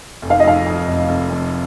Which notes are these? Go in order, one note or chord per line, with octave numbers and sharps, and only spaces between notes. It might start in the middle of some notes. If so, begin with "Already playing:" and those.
F1
F5
D#5
F2 F5
F2
F1
F1
F2